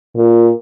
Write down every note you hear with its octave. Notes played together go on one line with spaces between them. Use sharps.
A#2